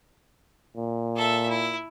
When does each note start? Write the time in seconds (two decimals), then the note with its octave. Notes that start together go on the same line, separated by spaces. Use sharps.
0.77 A#2
1.16 A4 E5
1.48 E4